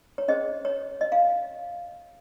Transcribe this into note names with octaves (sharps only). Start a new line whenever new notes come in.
C#5
C#4 G#4 C5 D#5
C#5
D#5
F5